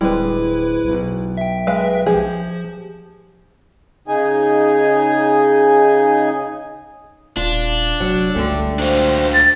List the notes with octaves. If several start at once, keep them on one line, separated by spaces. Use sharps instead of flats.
D1 G3 G#3 C4 E4 B4
B1
E5 G5
G#3 B4 F5
F3 G4 G#4
C#3 D#4 G#4 G#5
D#1 D4 F4
F1 F#3
C#2 D3 G3 A3
D4 F#4 C5 F5
A6